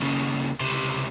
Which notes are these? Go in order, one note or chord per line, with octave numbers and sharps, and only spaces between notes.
D#2 C#3
C#2 C3